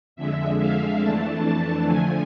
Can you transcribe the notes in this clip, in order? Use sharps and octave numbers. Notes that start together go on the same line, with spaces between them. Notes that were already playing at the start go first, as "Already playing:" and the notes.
F2 D3 G#3 E5
F5
F2 E3 A3 D4 A5
D3 F3 A3 G#5